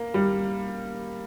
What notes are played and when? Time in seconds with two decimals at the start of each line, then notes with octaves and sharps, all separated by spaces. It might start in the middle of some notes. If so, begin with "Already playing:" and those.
Already playing: A#3
0.14 G3